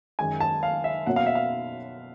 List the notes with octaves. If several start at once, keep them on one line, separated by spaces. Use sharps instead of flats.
F#2 D#3 G#3 G#5
A5
F5
E5
B2 F#3 A#3 C#4 F#5
F5
E5
F5